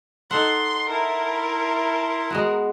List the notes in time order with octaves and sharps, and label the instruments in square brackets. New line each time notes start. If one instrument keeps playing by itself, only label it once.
[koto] D#4 A4 F#5 [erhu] C6
[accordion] E4 A5 C6 [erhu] A#4
[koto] G#3 B3 F#4